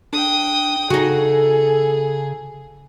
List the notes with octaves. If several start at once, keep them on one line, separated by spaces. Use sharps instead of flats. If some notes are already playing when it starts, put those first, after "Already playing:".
D4 G5 D#6
C#3 D#4 F#4 G#4 A4